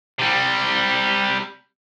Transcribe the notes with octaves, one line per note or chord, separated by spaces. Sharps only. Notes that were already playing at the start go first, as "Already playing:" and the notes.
C3 G3